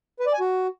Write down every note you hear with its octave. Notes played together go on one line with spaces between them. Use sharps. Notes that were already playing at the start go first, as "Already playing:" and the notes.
B4
D5
G#5
F#4